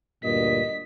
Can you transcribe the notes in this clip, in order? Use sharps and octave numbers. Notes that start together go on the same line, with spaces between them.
D2 G2 A#2 D#5 B6